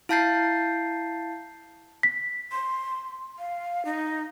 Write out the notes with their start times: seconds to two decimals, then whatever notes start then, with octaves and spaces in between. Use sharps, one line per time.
0.09 E4 F5 A5 G6 A6 C7
2.03 B6
2.52 C6
3.39 F5
3.85 D#4